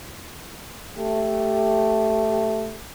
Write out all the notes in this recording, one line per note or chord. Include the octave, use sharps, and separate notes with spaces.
A3 G4